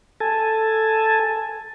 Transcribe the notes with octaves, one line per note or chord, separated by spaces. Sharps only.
A4 G#5 A5